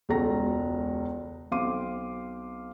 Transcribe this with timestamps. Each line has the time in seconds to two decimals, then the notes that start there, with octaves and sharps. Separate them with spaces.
0.09 E1 C#2 F#4 A4 A#5 A#6
1.51 B1 C4 F5 C6 D6 D#7